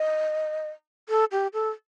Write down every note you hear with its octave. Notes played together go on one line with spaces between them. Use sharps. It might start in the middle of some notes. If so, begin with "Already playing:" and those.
Already playing: D#5
A4
G4
A4